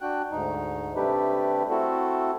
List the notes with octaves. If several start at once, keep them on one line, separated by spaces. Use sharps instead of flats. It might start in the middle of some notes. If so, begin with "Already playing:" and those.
D4 F#4 G5 F#6
D2 G#2 D#4
C3 G3 A3 D4 G4 B4
A3 C4 E4 F#4 A4